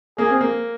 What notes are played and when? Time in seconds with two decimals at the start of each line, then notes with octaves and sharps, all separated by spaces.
0.18 A#3 G#4
0.30 C4
0.41 A#3